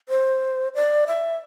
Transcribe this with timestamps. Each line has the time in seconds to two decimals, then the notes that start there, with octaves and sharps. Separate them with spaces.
0.09 C5
0.75 D5
1.07 E5